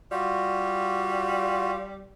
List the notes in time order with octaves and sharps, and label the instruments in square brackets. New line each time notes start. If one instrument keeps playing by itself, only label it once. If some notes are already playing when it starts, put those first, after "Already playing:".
[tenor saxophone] G3 [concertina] F4 F#4